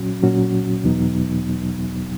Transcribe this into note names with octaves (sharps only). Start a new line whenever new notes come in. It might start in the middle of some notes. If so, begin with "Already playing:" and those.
Already playing: A#2 F#3 C#4 F#4
A#2 F#3 C#4 F#4
E2 B2 F#3 B3 D#4